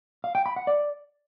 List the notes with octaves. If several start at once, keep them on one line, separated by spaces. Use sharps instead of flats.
F5
G5
B5
F#5
D5